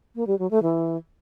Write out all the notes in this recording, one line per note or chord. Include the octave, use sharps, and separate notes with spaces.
A#3
G3
F#3
A3
E3